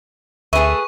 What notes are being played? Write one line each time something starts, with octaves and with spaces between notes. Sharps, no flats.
D2 A3 G#4 B4 E5 C#6